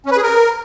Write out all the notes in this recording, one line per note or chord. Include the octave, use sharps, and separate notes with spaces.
C#4
B4
G#4
A#4